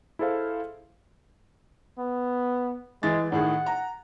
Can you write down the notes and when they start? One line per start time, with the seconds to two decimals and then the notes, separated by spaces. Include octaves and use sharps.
0.19 E4 G#4 A4 C5 F5
1.98 B3
3.03 E3 G#3 A6
3.32 A2 D#3 G#4 F#5
3.66 A#5